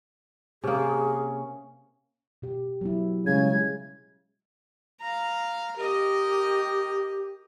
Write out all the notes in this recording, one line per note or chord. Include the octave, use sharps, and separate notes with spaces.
C3 A#3 C#4 G#4
B2 G4
F#3 B3 E4
C#3 G3 G#3 G#6
F5 A#5
G4 A#4 D#5